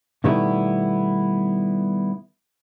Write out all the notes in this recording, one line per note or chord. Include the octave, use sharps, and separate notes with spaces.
B2 D#3 G3 A3 B3 E4